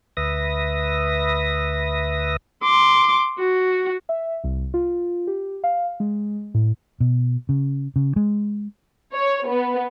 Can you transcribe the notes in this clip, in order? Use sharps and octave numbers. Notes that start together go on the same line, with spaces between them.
D2 B4 E5 D#6 A#6
C6 D6
F#4
E5
C2
F4
G4
F5
G#3
A2
B2
C#3
C#3
G#3
C#5
B3